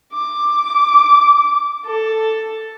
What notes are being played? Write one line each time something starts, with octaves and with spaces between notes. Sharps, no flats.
D6
A4